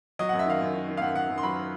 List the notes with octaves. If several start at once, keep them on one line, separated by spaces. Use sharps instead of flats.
F#3 D#5
F#2 F#5
E5
D#3 F5
F#2
D#3
D#3
F5
F#2 F#5
F#2 F#5
F#2
C6
F#3 B5